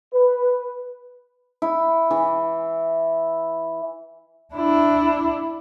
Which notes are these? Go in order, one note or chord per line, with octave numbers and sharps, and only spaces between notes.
B4
E4
E3
D4 E4